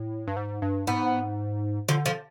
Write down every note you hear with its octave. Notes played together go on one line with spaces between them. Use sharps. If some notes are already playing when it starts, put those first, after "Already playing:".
Already playing: A2
G2
G#2
G2
G#2 B3
D3 F3
F3